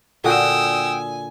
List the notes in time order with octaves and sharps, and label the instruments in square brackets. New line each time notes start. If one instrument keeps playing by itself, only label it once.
[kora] A#2 D3 F#4 [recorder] G5 [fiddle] G#5 [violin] D#6 E6